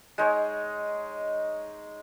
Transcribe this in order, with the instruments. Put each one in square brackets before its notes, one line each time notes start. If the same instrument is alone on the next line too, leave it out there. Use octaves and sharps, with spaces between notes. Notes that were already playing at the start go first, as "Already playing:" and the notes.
[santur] G#3 D#4 C#5